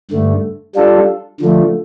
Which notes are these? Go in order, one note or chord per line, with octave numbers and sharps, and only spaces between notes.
G2 D3 A3
G3 D4 F4 A4
D3 F3 A3